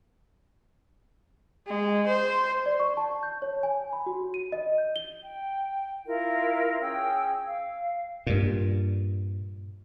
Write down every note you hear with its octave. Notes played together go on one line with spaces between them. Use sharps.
G#3
C5
D5
C#6
A5
G6
C#5
G#5
B5
F#4
D#7
D#5
G6
G7
G5
E4 F4 A#4
C#4 G#4 G5 E6
F5
G2 A#2